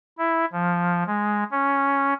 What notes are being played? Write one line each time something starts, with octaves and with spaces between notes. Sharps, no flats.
E4
F3
G#3
C#4